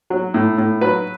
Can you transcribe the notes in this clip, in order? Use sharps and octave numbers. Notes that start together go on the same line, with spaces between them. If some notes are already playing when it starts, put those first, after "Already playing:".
F#3
A2
A2
F#3 B4